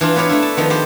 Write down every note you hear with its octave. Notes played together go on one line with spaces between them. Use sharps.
E3 D4 F4
B3 B4 C#5 D5 F5
A3 D4 E4
A5
D#3 F3 B3
B3 G4 C5